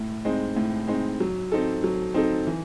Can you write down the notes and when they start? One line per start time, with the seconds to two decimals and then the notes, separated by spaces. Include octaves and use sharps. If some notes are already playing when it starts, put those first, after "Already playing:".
Already playing: A2
0.25 G#3 C4 D#4
0.57 A2
0.88 G#3 C4 D#4
1.20 F#3
1.52 C4 D#4 A4
1.84 F#3
2.14 C4 D#4 A4
2.47 E3